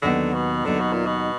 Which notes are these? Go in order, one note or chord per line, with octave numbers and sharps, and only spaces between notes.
D#2 D3 D#3 F#3 B3 D#4
B2
D#2 D3 D#3 F#3 B3 D#4
B2
A#2
B2